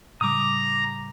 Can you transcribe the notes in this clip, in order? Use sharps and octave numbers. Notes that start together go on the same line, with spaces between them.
A2 C#3 G3 A#5 D6 D#6